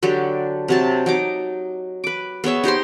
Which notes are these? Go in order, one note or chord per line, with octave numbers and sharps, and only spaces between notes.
D3 F#3 D4 G4
C3 F#3 A5
F#3 D#4 D6
B4 D6
B3 G#4 C#5 E5
D#4 G4 C5 C6